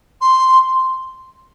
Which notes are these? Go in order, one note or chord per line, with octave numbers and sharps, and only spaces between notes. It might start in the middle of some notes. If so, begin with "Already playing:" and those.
C6